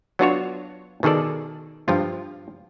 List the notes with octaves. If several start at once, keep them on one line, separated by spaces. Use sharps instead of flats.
F#3 B3 D4 F4 F#4 C#5
B2 D#3 G#4 A4 D5
G2 F3 F4